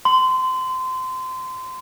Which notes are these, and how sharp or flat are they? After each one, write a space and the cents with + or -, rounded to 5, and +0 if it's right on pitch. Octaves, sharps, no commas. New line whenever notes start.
C6 -25